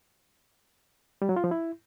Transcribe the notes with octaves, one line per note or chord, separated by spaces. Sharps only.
G3
F#3
F4
F3
E4